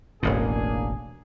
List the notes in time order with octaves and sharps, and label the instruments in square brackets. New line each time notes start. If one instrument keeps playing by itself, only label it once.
[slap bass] E1 A1 A2 [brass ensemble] A#3 D4 G#4